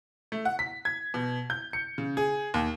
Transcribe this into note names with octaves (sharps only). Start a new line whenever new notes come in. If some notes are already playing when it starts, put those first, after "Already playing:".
A3
F#5
B6
G#6
B2
G6
C#7
C#3
G#4
D#2